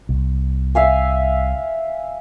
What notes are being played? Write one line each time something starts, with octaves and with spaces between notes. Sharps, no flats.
C2
E5 F5 G#5